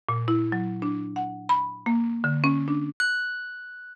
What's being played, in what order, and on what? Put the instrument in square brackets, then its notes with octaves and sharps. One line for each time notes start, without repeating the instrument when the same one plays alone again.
[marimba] A#2
E4
F#3
D4
F#5
B5
A#3
D3
C#4
D4
[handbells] F#6